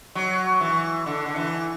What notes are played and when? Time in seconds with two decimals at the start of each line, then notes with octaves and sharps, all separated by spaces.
0.15 F#3
0.61 E3
1.06 D3
1.26 D3
1.36 E3